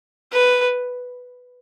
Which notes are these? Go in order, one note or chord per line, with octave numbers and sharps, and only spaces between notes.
B4